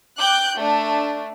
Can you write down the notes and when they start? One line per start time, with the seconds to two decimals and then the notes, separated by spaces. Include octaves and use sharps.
0.18 G5 D6 F#6 G6
0.57 A3 D4